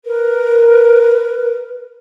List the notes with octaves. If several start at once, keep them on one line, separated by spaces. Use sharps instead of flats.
A#4 B4